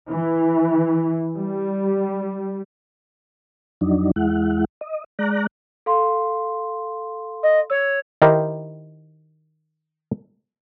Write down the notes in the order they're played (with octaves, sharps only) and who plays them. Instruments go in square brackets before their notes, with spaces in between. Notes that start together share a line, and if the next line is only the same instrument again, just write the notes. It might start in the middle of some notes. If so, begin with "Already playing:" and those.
[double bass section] E3
G3
[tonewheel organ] F2 F#3 D4 D#4
E2 G#3 E4 F#5
D#5
G#3 D5 A#5 F#6
[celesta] A4 F5 C6
[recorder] D#5
[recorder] C#5 [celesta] E6
[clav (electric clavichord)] D#3 D#4 E4 G4 A#4 C5